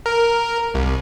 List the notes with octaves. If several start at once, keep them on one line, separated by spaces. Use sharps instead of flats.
A#4
C2